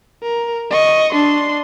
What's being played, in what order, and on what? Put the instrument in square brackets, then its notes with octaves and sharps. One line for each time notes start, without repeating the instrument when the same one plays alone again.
[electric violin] A#4
D#5 C#6
D4 C6